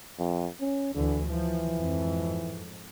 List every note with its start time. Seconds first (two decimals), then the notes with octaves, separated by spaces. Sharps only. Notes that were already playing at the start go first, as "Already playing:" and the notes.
0.19 F2
0.61 C#4
0.95 D2 D3 E3
1.29 E3 F3
1.79 F2 G#2